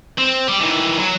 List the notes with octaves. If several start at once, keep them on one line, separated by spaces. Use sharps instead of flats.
C4
G4 D5
D#3 E3
F#3